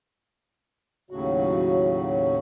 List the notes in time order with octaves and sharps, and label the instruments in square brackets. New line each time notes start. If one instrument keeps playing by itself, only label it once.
[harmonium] D#2 A2 C#3 F#3 F#4